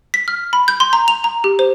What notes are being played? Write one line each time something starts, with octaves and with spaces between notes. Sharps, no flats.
B6
F6
B5
G6
C6
A#5
F7
A#5
G4
C5